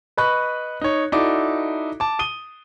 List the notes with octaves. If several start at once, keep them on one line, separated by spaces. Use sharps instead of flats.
B4 D#5 B5 C#6 F#6
D#4 C#5
D#4 E4 F#4 A4 D5 D6
A5 D6
D#6 D#7 G7